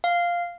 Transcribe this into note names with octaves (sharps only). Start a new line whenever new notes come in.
F5